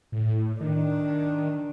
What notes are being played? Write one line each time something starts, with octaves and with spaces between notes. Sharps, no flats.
A2
D#3 D4